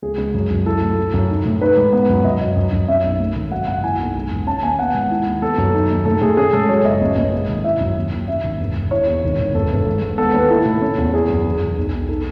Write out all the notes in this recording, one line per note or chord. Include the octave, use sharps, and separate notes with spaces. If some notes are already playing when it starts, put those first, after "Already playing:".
C#2 G#4
C#2
F#2
F#2
E4 A4
A2
E4
F#2
D#4
A2
D#4 B4
G#2
B3
F#2
F#2 D#5
F#2
F#2
F#2
C#4 E5
B1
A3
G#1
F#3 F#5
F#1 F#5
E4 G#5
B1
G#3
E1
C#4 A5
D#2 G#5
B3 F#5
G#2
E4
D#2
B3 A4
F#2
D#4
D#2
A2 A4
A2 G#4
C#4 G#4
G#2 A4
F#3 C#5
F#1 D#5
A1 D#5
A1
G#3
G#1
E4 E5
F#2
D#2
D#2
C#4 E5
G#1
E1
E1
E4 C#5
E2
G#1
G#1
E1 A4
E1
G#2
G#2
B3 A4
D#2 B4
E4 A4
A2
C#4
E2
E4 G#4
F#2
E1
E1
B1
B1
D#4 A4